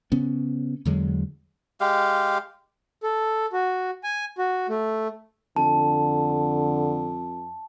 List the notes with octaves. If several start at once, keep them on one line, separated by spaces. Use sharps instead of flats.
C#3 B3 C#4
E2 D3 F#3 G#3
G#3 G4 F5
A4
F#4
G#5
F#4
A3
F2 D3 A5